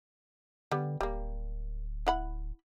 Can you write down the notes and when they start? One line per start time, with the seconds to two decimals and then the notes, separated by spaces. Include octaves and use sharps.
0.72 D3 G3 B3
1.01 D1 G3 A#3
2.07 E4 F#5 B5